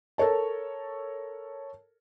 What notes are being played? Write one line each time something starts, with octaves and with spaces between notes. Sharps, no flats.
A4 A#4 C#5 A5